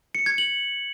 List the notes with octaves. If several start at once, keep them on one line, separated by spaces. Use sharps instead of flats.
C#7
G#6
F#7